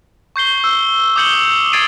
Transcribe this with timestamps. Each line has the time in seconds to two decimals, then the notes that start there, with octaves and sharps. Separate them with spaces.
0.36 C#6 G6 C7 G7
0.64 E6
1.16 D6 D#6 G6 C#7 F#7 G7
1.72 G#6 A6 C7 D7 D#7 G7